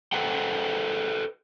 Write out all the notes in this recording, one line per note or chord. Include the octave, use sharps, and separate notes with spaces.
A4 B4 C5 D#5 F#5 G5